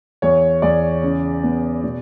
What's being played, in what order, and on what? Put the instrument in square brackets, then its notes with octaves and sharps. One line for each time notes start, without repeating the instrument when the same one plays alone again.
[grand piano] E2 C#5
E2 D5
C#3
B3
B2